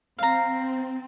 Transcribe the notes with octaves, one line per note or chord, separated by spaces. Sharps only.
C4 F5 A#5